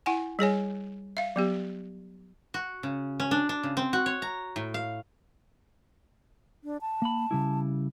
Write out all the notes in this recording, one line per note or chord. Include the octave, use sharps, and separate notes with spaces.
E4 F#5 G#5
G3 G#4 C#5 G#5
E5 F5
F#3 B3 G4
F#4
C#3
C#4
D4
D4
C#3
C4
F#4
C#5
A#5
A2
F5
D4
A5
A#3 B5
C#3 G3 E4